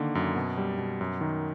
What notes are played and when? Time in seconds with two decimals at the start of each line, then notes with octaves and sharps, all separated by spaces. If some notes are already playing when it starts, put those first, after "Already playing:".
Already playing: D3 D#3 A#3
0.15 F#2
0.36 B2
0.57 G3
0.78 B2
1.01 F#2
1.21 D#3